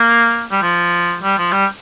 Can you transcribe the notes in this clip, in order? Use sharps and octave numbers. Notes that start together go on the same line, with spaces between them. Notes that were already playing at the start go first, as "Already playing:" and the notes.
Already playing: A#3
G3
F3
G3
F3
G3